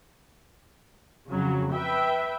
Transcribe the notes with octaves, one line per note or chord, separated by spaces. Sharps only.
F2 C#3 F#3
B4 E5 G5